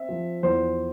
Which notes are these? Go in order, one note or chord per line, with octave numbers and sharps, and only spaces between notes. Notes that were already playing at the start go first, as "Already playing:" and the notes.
Already playing: C4 E5
F3
E2 C5